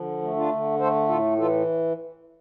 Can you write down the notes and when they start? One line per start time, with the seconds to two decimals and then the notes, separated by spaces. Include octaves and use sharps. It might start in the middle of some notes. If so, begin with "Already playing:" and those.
Already playing: D3 F3
0.22 A3
0.36 D4 F4
0.51 D3
0.79 A3 A4 C5
1.08 A2 F4 A4
1.38 E3 F4 A4